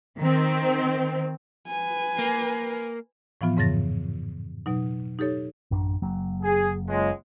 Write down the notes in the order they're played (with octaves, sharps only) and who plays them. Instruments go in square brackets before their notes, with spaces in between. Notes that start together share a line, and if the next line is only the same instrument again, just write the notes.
[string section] D#3 C4
[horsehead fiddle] B4 G#5
[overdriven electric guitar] A#3
[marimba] A2 E3 F3 B3 F4
F2 G#2 C#3 E3 A6 A#6
B2 F#3 D#4
D#4 G4 A4 C#5
[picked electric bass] A1 F#2 D4
F#1 F#3 A#3
[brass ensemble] G#4
C#2 G#3